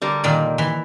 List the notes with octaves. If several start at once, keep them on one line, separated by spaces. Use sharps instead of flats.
D3 G3 A#4
A#2 D#3 D5
E3